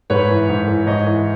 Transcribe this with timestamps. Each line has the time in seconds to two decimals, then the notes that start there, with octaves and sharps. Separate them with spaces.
0.10 G#2 B4 C#5
0.30 E3
0.49 G#2
0.68 E3
0.87 G#2 C#5 D#5
1.06 E3